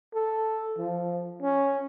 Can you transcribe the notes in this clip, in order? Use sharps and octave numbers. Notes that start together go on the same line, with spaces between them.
A4
F3
C#4